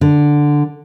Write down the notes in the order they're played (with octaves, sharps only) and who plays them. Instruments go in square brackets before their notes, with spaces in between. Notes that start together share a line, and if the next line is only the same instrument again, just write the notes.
[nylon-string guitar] D3